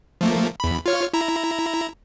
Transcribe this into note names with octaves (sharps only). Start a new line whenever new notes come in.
F3 A3 A#3
E2 B5
F4 C#5 F6
E4 A#5